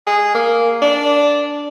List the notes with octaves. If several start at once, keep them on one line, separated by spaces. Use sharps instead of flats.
G#4
A#3
D4